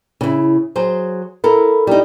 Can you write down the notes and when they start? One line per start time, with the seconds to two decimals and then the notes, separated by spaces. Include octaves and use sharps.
0.21 C#3 E4
0.76 F#3 G#4 C5
1.44 E4 A4 A#4
1.87 G3 D#4